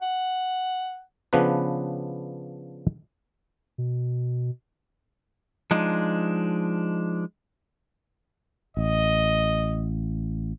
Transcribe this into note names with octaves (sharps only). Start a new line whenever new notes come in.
F#5
C#3 F3 B3 D4 B4
B2
F3 G#3 D4 D#4
A1 D#5